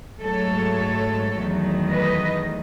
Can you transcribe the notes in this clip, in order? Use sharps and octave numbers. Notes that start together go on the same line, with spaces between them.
G#2 F#3 A3 A4 C#5
E2 D#3 F#3 A3
B4 D#5